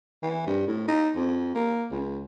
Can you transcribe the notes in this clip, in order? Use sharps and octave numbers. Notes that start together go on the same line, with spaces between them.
E3
G2
A2
D#4
F2
A#3
C#2